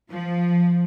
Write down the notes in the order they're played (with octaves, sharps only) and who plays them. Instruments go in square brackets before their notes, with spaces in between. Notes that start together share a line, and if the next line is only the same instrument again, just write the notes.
[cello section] F3